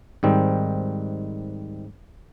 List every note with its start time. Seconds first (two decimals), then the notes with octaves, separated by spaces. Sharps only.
0.23 G#2 D#3 G3 C4